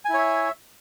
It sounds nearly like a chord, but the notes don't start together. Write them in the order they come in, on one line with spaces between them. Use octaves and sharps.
G#5 E4 C#5 E5